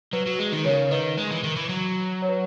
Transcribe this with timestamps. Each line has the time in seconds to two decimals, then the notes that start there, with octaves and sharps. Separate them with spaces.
0.13 F#3 B4
0.26 F#3
0.39 G#3
0.52 D#3
0.65 C#3 A#4 C#5
0.91 D#3 B4 D#5
1.18 G#3
1.31 E3
1.44 D#3
1.56 E3
1.69 F#3
2.22 C#5
2.29 B4